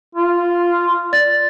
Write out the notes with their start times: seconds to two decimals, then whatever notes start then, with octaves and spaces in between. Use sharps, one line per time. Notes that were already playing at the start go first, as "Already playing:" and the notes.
0.15 F4
1.13 D5 A6